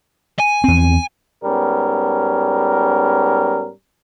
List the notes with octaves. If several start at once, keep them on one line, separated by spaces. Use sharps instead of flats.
G#5
E2 C4
G#2 G3 B3 C#4 A#4